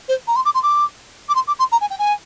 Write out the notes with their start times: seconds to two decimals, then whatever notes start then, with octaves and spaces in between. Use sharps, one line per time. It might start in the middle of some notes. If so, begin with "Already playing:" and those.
0.08 C5
0.27 A#5
0.36 C6
0.45 D6
0.54 C6
0.63 D6
1.29 D6
1.35 C6
1.47 D6
1.59 C6
1.72 A#5
1.81 G#5
1.90 G5
1.99 G#5